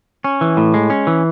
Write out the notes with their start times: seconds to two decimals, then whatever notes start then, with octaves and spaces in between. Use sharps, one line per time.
0.24 C#4
0.41 E3
0.57 A2
0.74 G#3
0.90 C#4
1.07 E3